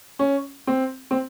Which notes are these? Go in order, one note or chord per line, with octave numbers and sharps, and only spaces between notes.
C#4
C4
C4